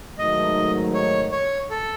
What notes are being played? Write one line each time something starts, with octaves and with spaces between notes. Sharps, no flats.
G#2 D#3 F#3 A3 D#4 D#5
C#5
C#5
A4